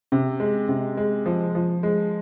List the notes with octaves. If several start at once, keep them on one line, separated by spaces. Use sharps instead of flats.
C3
G#3
C3
G#3
F3
F3
G#3